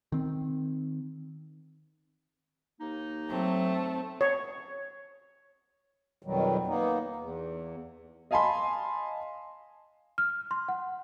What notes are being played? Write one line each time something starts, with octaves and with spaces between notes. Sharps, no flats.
D#3 C4
D#2 A#3 D#4
F#3 A3 C4
C#5
F2 B2 D#3 F#3 G3
A#3 B3 D#4
E2
D#5 F5 G#5 A5 B5 C6
F6
C6
F#5